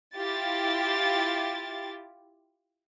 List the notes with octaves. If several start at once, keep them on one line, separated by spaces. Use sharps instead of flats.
E4 F4 G4 A6